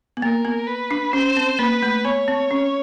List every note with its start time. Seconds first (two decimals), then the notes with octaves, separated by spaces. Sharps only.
0.17 B3
0.22 A#3 A#4
0.45 B3
0.67 B4
0.91 D4
1.13 C#4 C5
1.37 C4
1.59 A#3 B4
1.83 A3
2.05 B3 C#5
2.28 C4
2.51 C#4